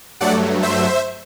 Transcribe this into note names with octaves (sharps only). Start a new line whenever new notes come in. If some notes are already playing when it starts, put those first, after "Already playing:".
G2 F#3 A3 D5 F#5
C5 E5